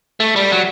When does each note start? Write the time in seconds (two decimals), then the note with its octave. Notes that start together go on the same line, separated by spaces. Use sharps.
0.20 A3
0.36 G3
0.52 F#3